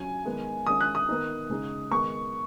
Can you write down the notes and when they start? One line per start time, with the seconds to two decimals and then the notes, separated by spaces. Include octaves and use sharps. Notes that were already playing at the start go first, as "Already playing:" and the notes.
Already playing: F#3 C#4 G#5
0.25 D#3 G#3 B3
0.66 D#3 G#3 C#4 D#6
0.81 F#6
0.95 D#6
1.09 D#3 B3 D#4
1.50 C#3 G#3 D#4
1.91 D#3 G#3 B3 C#6